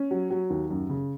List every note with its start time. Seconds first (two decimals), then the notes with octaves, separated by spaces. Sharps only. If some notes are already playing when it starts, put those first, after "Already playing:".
Already playing: C#4
0.11 F#3
0.31 F#3
0.50 D#2
0.70 F#2
0.90 C#3